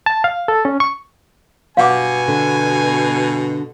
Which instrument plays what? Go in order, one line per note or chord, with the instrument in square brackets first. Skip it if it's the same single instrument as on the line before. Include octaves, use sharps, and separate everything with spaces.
[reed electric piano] A5
F5
A4
C#4
C#6
[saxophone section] G2 B2 [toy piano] F5 F#5 D6 [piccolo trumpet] G#5
[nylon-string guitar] D3